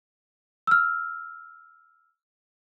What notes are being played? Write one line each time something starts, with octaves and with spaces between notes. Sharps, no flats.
E6 F6